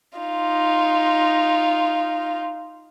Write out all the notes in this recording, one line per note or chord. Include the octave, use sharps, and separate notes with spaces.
D#4 F4